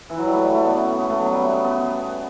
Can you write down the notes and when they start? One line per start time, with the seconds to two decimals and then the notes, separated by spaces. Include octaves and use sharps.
0.10 E3
0.18 F#3
0.27 G3
0.35 A3
0.43 G3
0.54 A3
0.65 B3
0.76 C#4
0.87 B3
0.98 B3
1.09 A3
1.20 F#3
1.31 G3
1.42 B3
1.54 B3
1.65 B3